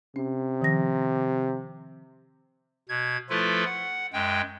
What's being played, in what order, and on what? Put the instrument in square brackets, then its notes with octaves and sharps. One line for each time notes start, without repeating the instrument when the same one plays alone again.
[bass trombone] C3 [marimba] C#4
[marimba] D#3 F3 A#6
[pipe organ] B2 G#6
F3 A3 E4 F4 A4 B4
F#5
F#2 G#3 G5